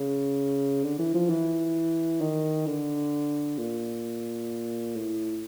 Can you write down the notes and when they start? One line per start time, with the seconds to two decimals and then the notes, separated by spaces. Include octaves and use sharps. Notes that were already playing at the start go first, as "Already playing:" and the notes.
Already playing: C#3
0.83 D3
0.99 E3
1.14 F3
1.30 E3
2.21 D#3
2.66 D3
3.58 A#2
4.95 A2